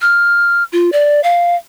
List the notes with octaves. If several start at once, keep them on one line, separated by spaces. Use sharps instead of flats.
F6
F4
D5
F5